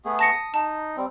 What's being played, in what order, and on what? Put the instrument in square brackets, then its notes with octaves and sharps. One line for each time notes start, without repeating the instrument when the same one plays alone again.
[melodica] A3 B3 G#4
[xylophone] A5 A#6 C#7
[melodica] D#6
[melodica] D#4 [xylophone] A5
[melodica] G3 C4